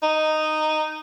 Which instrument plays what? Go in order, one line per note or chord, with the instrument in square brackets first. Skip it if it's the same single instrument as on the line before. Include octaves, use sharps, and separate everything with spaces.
[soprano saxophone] D#4